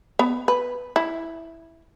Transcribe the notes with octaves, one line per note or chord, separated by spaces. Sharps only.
B3
B4
E4